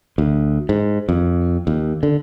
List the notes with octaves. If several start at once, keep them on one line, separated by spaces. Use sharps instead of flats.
D2
G#2
F2
D#2
D3